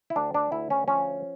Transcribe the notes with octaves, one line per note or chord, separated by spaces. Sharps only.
E4
D2 D4
D4
D2 E4
C#4
F3 C#4